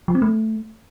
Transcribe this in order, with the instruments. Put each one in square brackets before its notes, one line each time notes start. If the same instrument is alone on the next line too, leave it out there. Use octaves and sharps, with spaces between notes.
[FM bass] F3
C4
A3